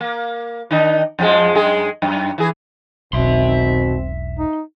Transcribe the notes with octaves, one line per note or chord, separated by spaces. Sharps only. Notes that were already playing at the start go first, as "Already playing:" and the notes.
A#3
D#3 D4 D#4
F2 F3 G#3
F#2 G#3 G#4
F#2
E3 G#4
E1 B1 B2 D#3 C4 E5 C6
D#4